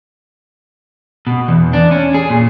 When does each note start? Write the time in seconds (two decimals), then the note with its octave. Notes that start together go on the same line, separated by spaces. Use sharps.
1.27 B2
1.48 E2
1.73 D4
1.91 C#4
2.14 G#4
2.30 A#2